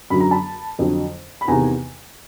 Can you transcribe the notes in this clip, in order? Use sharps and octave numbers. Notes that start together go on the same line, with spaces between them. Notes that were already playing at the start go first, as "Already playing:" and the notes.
F#2 D3 F#3 B5
A#5
A5 B5
F2 D3 F#3
B5
E2 C3 D#3 G#5 A#5